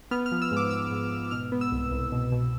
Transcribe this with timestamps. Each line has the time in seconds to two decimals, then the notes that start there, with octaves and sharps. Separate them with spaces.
0.11 B3 F6
0.26 F6
0.32 F3
0.42 E6
0.51 G#2
0.57 D6
0.71 G#2 E6
0.91 G#2
1.11 G#2
1.31 B2 F6
1.52 B3
1.61 E6
1.72 C2
1.92 C2
2.12 B2
2.32 B2